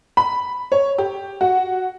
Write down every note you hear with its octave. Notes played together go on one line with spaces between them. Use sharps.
B5
C#5
G4
F#4